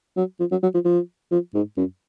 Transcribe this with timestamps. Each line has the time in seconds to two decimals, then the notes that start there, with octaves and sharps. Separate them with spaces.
0.17 F#3
0.40 F3
0.51 F#3
0.63 F#3
0.74 F3
0.85 F3
1.31 F3
1.54 G#2
1.77 F#2